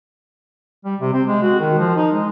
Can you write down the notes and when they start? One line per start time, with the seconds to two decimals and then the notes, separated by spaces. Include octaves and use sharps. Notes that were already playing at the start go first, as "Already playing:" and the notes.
0.85 G3
1.00 C3
1.13 C4
1.28 G#3
1.42 F#4
1.60 D#3
1.78 F3
1.96 D#4
2.12 G#3